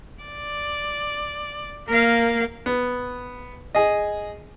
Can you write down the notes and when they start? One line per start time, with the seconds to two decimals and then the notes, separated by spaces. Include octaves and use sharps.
0.24 D5
1.88 A#3 A#4 F5
2.66 B3
3.75 G#4 D#5